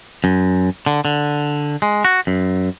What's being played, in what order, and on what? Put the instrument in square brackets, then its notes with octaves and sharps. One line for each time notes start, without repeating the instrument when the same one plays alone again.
[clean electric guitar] F#2
D3
D3
G#3
F#4
F#2